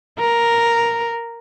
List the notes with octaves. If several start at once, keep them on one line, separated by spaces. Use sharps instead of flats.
A#4